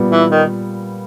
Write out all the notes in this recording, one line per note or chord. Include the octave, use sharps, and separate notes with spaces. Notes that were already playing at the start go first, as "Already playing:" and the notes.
Already playing: A#2 G3 B3
E3
D#3